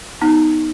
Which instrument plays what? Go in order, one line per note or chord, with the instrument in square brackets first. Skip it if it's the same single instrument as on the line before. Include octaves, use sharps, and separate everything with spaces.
[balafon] B3 D#4